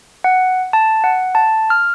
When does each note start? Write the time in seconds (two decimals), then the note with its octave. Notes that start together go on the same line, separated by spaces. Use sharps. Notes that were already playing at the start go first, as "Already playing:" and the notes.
0.24 F#5
0.73 A5
1.04 F#5
1.35 A5
1.70 F6